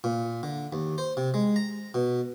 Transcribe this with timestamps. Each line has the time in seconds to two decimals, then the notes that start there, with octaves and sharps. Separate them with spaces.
0.04 A#2
0.43 D3
0.73 D#2
0.98 C5
1.17 C3
1.34 G#3
1.56 A#5
1.94 B2